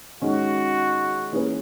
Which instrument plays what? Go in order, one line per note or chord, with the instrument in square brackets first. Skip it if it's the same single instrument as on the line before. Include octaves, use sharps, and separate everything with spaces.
[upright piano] D#3 G#3 C#4 [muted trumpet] F#4
[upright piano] E3 A#3 C#4 G#4 B4